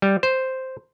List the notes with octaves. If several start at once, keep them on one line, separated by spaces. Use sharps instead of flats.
G3
C5